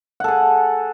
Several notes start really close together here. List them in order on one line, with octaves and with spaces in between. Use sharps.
F#5 A4 G#4